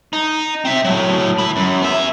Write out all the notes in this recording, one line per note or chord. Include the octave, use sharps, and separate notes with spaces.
D#4
C4 E5
A2 F#3
E3 B5
F#2
B3 E5